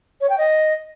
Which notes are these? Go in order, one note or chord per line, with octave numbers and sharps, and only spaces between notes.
C#5
G5
D#5